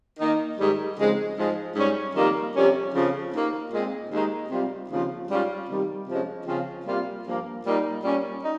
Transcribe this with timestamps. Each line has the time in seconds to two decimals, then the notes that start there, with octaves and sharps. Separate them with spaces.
0.19 D#3 A#3 D#4
0.58 G#2 D#3 G3
0.98 F2 C#3 G#3 C4 D#4
1.37 G#2 F3 G#3
1.76 G#2 G3 C#4
2.15 F2 D#3 G3 A#3
2.54 F2 C3 G3 C#4
2.94 F2 C#3 F3
3.33 D#2 D#3 A#3
3.72 A#2 G#3 C4
4.11 D#2 D#3 G#3 D#4
4.50 C3 G3 C4 F4
4.89 D#2 C#3 F3 C4 F4
5.28 G#2 G3 C#4 F4
5.68 C3 D#3 G3
6.07 C3 F3 G#3 C#4
6.46 C#3 F3 C4 F4
6.86 C3 G3 A#3 F4
7.25 G2 F3 A#3
7.64 A#2 G3 A#3 D#4
8.03 A#2 G3 C#4
8.42 D#4